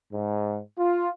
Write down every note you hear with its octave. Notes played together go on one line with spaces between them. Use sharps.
G#2
F4